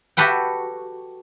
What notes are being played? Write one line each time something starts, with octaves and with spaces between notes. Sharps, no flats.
F#4 G4 A4 B4 F#5 G5